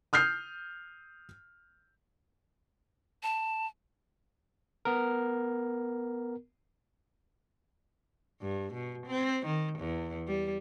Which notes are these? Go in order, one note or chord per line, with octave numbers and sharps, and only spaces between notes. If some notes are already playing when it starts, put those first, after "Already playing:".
D#6 F6 G6 C7
A5
B3 A#4
G2
B2
C4
D#3
E2
G3